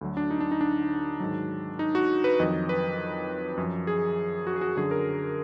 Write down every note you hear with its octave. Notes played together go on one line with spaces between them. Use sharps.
D2 D3 F#3
D4
D#4
D4
D#4
D4
G#2 D#3 F#3
D#4
F#4
B4
F2 D#3 F#3 D#5
B4
F#2 F3
G#4
F#4
G#4
F#4
F#2 D3 F#3 G#4
A#4